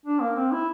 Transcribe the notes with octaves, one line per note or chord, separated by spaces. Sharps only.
D4
A#3
C4
E4